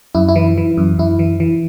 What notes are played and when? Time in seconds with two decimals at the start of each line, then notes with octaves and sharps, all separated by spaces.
0.15 F#2 E4
0.28 E4
0.36 E3
0.58 E3
0.77 F#2
0.98 F#2 E4
1.19 E3
1.40 E3